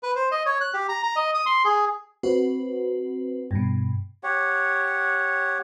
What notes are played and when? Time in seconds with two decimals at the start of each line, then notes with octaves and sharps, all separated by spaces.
0.03 B4
0.16 C5
0.32 D#5
0.46 C#5
0.61 F#6
0.74 G4
0.89 A#5
1.03 A#5
1.16 D#5
1.35 D#6
1.46 C6
1.65 G#4
2.23 C4 F#4 B4
3.51 G2 B2
4.23 G4 C#5 F#5